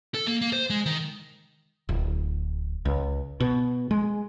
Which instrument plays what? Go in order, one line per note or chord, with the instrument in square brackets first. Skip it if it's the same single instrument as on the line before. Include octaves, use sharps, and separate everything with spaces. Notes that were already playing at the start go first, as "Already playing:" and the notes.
[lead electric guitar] A4
A#3
A#3
C5
G#3
D#3
[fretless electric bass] D1
C#2
B2
G#3